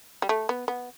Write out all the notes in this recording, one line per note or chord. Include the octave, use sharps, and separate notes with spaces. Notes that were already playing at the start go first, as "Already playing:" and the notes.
G3
A3
B3
B3